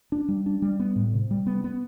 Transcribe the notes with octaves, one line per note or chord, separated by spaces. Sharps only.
D4
G3
D4
G3
B3
A2
C3
G3
B3
B3